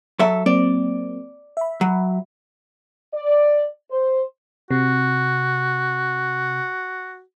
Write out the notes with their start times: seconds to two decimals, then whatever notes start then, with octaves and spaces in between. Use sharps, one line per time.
0.19 F#3 A4 E5
0.46 F#3 A#3 C4 D5
1.57 E5 B5
1.81 F#3
3.13 D5
3.90 C5
4.71 C3 F#4